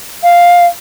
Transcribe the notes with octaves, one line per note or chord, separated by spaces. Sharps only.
F5